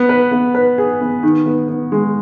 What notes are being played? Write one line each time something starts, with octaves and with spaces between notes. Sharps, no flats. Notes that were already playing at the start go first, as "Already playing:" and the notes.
Already playing: B3
B4
B3
B4
G#4
B3
D#3
B3
B3
G#3